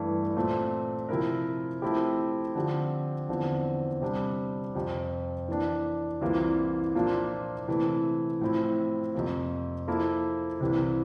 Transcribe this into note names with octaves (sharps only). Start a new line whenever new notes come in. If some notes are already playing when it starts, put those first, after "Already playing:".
Already playing: G2 E3 A3
A#2 A3 C4
C3 F3 C4 E4 A#4
F3 A3 C4 E4 G4
D3 F3 C4 G4
E2 D3 F3 C4
C3 G3 D4 G4
F2 C3 F3
E3 A#3 D4
C2 C3 E3 A#3 F4
A#2 F3 A#3 D4 F4
C3 E3 A3
A2 F3 C4 E4
F2 C3 F3 A#3
F3 A#3 E4 A4
C2 C3 E3